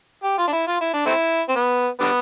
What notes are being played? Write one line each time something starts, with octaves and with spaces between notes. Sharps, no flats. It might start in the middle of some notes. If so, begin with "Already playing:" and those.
G4
F4
D4
E4
F4
E4
D4
A3 C4 E4
C4
B3
D3 G3 B3